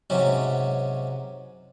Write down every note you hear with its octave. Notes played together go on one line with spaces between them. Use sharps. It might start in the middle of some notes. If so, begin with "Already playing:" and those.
G#2 C3 F#3 C#4